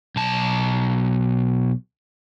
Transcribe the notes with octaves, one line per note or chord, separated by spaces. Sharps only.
B1 A5